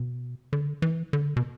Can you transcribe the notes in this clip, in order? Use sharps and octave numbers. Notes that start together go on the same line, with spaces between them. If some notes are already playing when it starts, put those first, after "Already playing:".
Already playing: B2
D3
E3
D3
B2